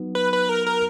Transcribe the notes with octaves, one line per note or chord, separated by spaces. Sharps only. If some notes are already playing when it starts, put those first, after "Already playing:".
Already playing: F#3 B3 D#4
B4
B4
A#4
A#4